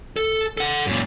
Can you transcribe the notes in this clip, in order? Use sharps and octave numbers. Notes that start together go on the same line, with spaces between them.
A4
A4 F#5
F#2 A#2